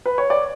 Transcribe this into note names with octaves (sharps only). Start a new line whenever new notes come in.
B4
C#5
D5